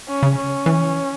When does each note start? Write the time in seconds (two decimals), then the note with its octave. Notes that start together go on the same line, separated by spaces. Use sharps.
0.08 C#4
0.23 C#3
0.38 C#4
0.66 E3